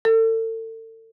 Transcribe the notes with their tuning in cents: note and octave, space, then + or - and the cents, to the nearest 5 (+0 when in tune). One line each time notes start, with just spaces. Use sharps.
A4 +35